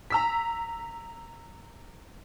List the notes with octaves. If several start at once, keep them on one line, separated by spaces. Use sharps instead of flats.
A#5 E6 B6